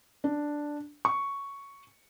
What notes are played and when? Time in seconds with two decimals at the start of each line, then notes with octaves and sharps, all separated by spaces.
0.24 D4
1.05 C#6